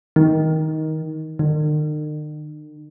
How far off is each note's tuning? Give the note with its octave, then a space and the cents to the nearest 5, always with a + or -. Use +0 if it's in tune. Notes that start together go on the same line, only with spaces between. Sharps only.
D#3 +15
D#3 -45